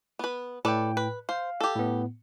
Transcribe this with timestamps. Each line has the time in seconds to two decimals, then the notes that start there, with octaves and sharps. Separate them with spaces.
0.19 B3 B4
0.65 A2 A4 B4 D5 G5
0.97 B4
1.29 C5 F5
1.61 G4 A4
1.76 A2 B3